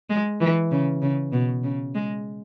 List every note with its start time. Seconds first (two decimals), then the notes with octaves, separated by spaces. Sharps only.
0.10 G#3
0.40 E3
0.71 C#3
1.02 C#3
1.33 B2
1.64 C#3
1.95 G#3